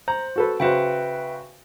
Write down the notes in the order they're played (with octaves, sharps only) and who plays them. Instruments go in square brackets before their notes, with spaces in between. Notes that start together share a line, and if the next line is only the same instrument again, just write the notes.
[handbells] C5 [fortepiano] A#5
[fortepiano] F#4 A4 B4
[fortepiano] C#3 F#4 C5 [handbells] B4 E5 G5